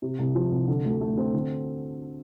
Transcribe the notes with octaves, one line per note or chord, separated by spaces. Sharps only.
C3
C2
F3
C2
D3
D2
A3
C4
D3